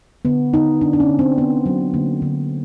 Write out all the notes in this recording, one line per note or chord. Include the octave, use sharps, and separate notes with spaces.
D3 B3
D3 D#4
D3 D4
D4
C#4
D3
C4
D3 B3
F#3
D3 A#3
D3